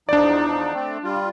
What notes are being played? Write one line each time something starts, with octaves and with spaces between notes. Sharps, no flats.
E2 F3 D4 D#4 D5
A3 C4
G3 F4